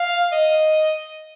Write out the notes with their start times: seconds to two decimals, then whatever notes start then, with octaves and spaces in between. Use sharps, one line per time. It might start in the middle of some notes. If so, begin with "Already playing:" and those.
Already playing: F5
0.32 D#5